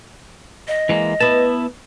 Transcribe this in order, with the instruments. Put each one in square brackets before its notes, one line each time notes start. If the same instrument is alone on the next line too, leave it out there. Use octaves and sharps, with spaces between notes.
[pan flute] D#5
[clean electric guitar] E3 G#3 A#3
[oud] B3 B4 [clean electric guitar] E4 A5